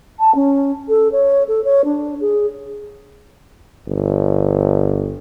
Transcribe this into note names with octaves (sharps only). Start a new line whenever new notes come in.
A5
C#4
A4
C#5
A4
C#5
D4
G#4
G1